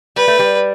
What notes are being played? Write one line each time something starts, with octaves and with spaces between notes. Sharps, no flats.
G3 B4
A3
G3